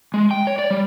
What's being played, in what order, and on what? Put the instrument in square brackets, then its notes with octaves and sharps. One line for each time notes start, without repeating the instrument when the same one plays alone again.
[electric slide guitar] G#3
G5
C#5
D5
G3